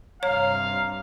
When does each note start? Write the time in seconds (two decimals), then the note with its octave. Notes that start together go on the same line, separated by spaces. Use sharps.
0.23 G2 C3 C#5 F5 A#5